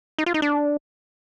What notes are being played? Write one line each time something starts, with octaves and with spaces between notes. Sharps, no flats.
D#4
F4
D#4
D4